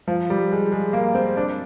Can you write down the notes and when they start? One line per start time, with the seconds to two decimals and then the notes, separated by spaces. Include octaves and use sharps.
0.08 F3
0.30 G3
0.52 G#3
0.72 G#3
0.93 A#3
1.15 C4
1.37 D4